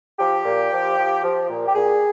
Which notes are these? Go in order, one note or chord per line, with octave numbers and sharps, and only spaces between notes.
F3 G4
A#2
F3
F3
F3
A#2
G4
A#2 G#4